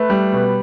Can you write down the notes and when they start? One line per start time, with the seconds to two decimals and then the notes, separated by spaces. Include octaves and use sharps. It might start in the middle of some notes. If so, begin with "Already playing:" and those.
Already playing: A3 B4
0.10 G3
0.33 B2